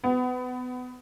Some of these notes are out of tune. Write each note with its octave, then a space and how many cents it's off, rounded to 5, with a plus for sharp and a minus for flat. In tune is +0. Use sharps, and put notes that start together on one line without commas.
B3 +25